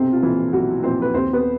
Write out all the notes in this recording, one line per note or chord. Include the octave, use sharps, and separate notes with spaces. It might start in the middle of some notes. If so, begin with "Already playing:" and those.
Already playing: B1 C3 C4
F4
A#2 E3 F3 E4
B1 F#3 F#4
A#2 F3 C4 C5
B4
D#2 C4 C5
B3 B4